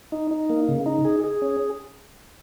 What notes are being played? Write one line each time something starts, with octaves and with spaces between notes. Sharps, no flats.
D#4
D#4
A#3
C#3
D#4
G#4
G#4
C#4